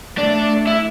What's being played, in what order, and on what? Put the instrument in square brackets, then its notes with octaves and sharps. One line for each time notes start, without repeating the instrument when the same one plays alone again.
[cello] A3 [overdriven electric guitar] D4
[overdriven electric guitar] E4